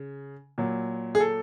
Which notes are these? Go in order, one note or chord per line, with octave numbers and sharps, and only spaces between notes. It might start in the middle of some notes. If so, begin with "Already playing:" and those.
Already playing: C#3
A#2 F#3
G#4
A4